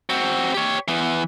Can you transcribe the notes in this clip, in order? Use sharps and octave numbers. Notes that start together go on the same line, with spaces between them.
C4 F#4
G4 C#5
E3 B3